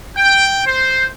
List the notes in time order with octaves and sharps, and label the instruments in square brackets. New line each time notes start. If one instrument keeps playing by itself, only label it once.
[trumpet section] G5
C5